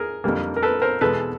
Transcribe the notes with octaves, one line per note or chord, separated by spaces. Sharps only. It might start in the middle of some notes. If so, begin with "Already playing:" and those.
Already playing: G#4 A#4
F2 D3 G3 A#3
A#4
A4 B4
A#4 C5
E2 B2 G#3 A4 B4